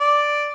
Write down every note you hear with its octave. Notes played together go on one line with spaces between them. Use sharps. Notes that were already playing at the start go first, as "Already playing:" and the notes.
D5